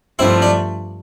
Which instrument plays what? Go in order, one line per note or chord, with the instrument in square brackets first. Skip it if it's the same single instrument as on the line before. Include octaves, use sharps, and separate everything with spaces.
[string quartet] G2 F3 A3 D4 [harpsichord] C4 E4
[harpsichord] D4